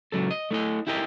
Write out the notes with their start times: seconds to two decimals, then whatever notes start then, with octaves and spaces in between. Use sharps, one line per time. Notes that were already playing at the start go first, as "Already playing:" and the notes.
0.12 C#2 F#3 A4
0.31 D#5
0.51 A3 E4 D#5
0.87 E4 G4 A4 A#4 D#5